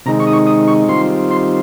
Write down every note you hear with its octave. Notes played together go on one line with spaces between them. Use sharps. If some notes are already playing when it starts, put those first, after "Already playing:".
C3 D#3 G#3 D#4 A#5
C#6
D#6
C#6
D#6
C#6
D#3 G3 C4 F4 C6
C6